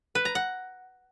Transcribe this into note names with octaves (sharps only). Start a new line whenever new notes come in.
B4
A#5
F#5